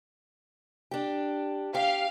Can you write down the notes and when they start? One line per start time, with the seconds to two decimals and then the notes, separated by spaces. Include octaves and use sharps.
0.91 D4 G4
1.75 G4 F5